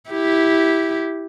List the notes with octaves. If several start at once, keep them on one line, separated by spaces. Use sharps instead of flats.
E4 G4